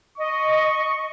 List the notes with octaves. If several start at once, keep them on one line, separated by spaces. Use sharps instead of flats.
D#5 C#6